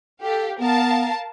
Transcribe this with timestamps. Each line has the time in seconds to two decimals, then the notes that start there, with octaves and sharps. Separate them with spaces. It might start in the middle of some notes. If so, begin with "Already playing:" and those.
0.23 G4 A4 F5
0.60 B3 A#4 F5 A5